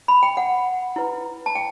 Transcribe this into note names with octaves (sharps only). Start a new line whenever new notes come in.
B5
G5
F#5
E4 B4
A5
G5